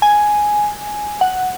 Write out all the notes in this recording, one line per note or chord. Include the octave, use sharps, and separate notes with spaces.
G#5
F#5